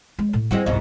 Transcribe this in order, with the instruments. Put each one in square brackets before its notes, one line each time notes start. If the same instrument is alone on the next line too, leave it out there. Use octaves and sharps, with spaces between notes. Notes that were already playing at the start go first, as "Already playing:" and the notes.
[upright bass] G#3
A2
[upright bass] G3 E4 [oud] G#3 C4 F#4
[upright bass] C2 F2 [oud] G#2 B2